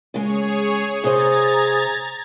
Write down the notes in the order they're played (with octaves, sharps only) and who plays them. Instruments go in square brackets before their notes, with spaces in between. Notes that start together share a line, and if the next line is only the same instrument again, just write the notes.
[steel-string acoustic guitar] C#3 G#3 [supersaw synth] G#4 C#5
[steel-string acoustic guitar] C3 C5 [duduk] G#4 [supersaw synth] A#5 G#6 A6